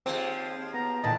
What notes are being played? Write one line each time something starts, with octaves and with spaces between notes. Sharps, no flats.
D#2 F3 G#3 C4
B3 A#5
A#2 D3 E3 D#5 G5 A5